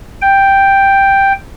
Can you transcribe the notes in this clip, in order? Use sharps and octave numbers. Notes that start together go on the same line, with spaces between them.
G5